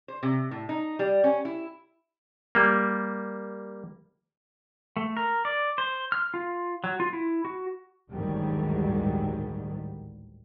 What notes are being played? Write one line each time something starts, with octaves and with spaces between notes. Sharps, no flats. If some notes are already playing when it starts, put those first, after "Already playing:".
C5
C3
A2
D#4
G3
C#4
E4
G3 A#3
A3
A#4
D5
C5
F6
F4
F#3
F4
E4
F#4
A1 D2 G#2 D#3 F#3 G3